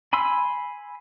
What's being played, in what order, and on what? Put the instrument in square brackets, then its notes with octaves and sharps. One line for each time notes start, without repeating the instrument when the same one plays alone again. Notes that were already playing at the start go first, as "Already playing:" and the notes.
[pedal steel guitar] G#5 B5 C6 E6